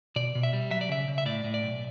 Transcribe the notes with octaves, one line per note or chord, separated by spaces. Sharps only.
B2 D5
B2
E5
G3
F#3 E5
D5
C#3 E5
C#3
E5
A2 D5
A2
D5
B1